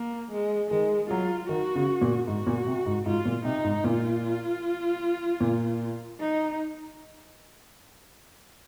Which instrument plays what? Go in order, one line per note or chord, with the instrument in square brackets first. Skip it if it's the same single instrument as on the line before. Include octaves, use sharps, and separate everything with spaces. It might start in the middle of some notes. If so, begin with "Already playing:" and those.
Already playing: [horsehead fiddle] A#3
G#3
[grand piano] D#3 [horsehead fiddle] G#3
[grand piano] F#3 [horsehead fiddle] F4
[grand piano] D#3 [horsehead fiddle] F#4
[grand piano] C#3
A#2
[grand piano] G#2 [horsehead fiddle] F#4
[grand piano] A#2
C3
G#2
[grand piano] G#2 [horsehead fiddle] F4
[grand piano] A#2
[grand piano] C3 [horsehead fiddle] D#4
[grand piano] G#2
[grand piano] A#2 [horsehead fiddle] F4
[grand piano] A#2
[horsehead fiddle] D#4